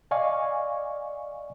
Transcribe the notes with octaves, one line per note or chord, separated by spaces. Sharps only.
D5 D#5 F5 G#5 C#6